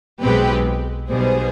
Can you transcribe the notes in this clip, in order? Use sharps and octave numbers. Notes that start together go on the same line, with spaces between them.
B1 B2 G#3 C4 G4 B4
B1 B2 G3 B3 G#4 C5